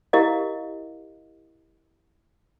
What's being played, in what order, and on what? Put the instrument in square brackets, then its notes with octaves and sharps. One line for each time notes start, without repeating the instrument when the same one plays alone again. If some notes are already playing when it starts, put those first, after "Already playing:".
[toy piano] E4 G4 A#4 D#5 F5